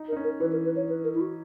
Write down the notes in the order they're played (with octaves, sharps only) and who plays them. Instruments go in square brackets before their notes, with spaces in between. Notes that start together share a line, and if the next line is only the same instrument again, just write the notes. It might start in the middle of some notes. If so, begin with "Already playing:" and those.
Already playing: [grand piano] D#4
[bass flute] A#4
[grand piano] D#4
C#4
[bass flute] A#4
[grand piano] E3 [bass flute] B4
[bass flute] A#4
B4
C#5
B4
A#4
E4
F#4